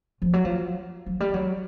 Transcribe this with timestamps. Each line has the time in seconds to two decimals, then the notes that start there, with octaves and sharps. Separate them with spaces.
0.22 F3
0.33 F#3
0.45 F3
1.06 F#3
1.20 G3
1.34 F#3